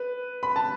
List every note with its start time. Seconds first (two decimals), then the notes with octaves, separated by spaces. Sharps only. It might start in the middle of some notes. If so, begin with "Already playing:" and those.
Already playing: B4
0.43 B5
0.56 A5